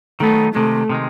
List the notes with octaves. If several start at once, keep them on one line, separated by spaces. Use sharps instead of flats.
D#3 F#3 A3 B3 D#4
C3 D#3 G#3 A3
C3 D#3 G#3